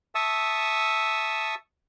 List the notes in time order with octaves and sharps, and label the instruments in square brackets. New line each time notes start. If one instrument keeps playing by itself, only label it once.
[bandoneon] E5 A5 C#6 D#6 E6